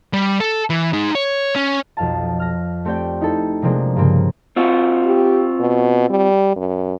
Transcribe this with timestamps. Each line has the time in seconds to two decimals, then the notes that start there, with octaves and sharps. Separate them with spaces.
0.13 G3
0.40 A4
0.70 E3
0.93 D#4 G#4
1.15 C#5
1.56 C#4
1.97 B1 F2 F5 A5
2.40 F6 A#6
2.85 A3 C4 G4 D5 G5
3.21 D#4 E4 A4
3.62 C3 F3 G#3 A#3 C4 D4
3.96 G2 C#3 A#3 C4
4.56 C4 F4 F#4
5.05 G4
5.60 B2
6.10 G3
6.56 F#2